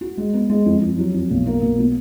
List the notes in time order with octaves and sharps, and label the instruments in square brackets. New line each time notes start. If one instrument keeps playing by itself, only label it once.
[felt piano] F#4
G#3
B3
G#3
F2
F2
F#3
F2
B1
A#3
B1
B2